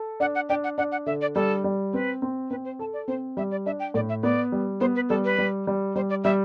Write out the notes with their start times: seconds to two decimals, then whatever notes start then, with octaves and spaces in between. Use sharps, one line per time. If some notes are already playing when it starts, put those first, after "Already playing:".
Already playing: A4
0.20 D4 F#5
0.35 F#5
0.49 D4 G5
0.64 F#5
0.78 D4 F#5
0.92 F#5
1.06 D3 E5
1.21 D5
1.35 G3 A4
1.64 G3
1.93 C4 B4
2.22 C4
2.50 C4 B4
2.65 C5
2.79 A4 A5
2.93 D5
3.08 C4 C5
3.37 G3 E5
3.51 D5
3.66 D4 E5
3.80 G5
3.94 A2 D5
4.09 E5
4.23 B3 D5
4.52 G3
4.81 B3 C5
4.95 B4
5.09 G3 A4
5.25 B4
5.38 G3
5.67 G3
5.96 G3 C5
6.10 D5
6.24 G3 E5